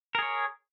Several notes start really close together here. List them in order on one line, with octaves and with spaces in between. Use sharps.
A#4 G#4 C#5